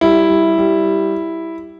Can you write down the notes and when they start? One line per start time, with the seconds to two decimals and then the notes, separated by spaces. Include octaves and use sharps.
0.01 G3 E4
0.29 G3
0.58 G3